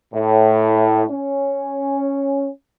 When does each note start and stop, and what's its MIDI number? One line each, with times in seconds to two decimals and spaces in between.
0.14 1.04 45
1.09 2.49 61